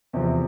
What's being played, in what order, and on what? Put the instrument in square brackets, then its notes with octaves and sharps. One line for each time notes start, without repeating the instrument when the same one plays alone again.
[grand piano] E2 C3 F3